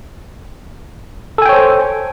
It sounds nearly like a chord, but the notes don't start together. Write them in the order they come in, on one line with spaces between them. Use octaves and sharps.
A4 G#5 G5 C#5 C5